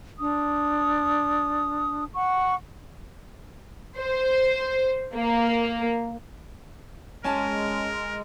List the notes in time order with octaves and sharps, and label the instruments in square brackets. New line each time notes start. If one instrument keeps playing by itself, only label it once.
[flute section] D4 D#6
F#5 C#6
[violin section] C5
A#3
[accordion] G#3 [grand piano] C#4 G#5 A5 [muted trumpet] A#4